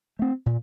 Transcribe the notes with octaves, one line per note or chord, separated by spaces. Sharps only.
A3 C4
A#2